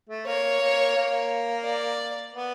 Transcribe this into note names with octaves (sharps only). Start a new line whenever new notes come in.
A3
A#3 C#5
A#3
A#3
D5
B3